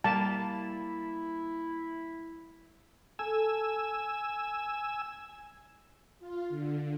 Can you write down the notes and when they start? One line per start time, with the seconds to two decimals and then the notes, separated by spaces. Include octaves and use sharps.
0.04 G3 A#3 E4 A5
3.19 A4 G#5 E6
6.20 F4
6.49 D3